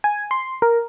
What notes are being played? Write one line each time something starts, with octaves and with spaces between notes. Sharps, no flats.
G#5
C6
A#4